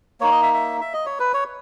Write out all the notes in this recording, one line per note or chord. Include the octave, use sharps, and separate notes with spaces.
A#3 D#4 C#5
D#5
E5
E5
E5
D#5
C#5
B4
C#5